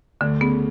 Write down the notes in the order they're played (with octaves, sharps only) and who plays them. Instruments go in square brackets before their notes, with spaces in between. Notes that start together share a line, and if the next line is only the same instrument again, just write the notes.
[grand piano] D2 [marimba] D3
[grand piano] C#3 [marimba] B3